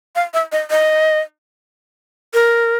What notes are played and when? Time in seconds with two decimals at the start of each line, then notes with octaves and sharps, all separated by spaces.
0.16 F5
0.34 E5
0.52 D#5
0.70 D#5
2.34 A#4